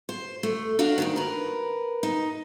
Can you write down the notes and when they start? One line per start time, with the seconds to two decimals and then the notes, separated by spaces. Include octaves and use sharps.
0.09 C5
0.43 A3
0.79 D4 F#4 F5
0.98 D2 B2 D#3
1.16 A#4 B4
2.03 D#4